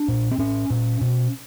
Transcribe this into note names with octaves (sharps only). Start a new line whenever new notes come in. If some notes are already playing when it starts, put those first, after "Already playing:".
Already playing: D4
A#2
C4
A2 C#4
A#2
B2